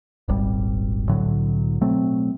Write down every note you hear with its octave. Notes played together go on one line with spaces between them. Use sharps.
D#1 G#1 G3
C2 A2 D3 F#3
B2 F#3 A3 C4